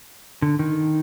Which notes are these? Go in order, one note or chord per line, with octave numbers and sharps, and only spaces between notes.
D3
D#3